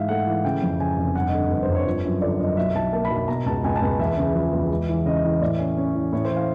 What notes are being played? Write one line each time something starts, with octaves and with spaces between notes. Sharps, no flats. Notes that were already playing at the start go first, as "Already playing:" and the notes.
Already playing: G#2 E3 E5 F5
A3 F#5
E3
C#3 G5
F2
C#3 G#5
F1
G2 F#5
D#5
D3
G1
C5
G1
C#5
F3
F#2
D3 D5
F#2 D#5
B1 E5
B1 A5
A#3 A5
B5
B1
B5
B2 A#5
C#2 A5
C#2 G#5
A5
C#2
E2 E5
C#3
F3
E2
G#3
E3
C#3 D#5
E3
A2 D5
C#4
C#4
E3
A2 C#5
C5
E3
F5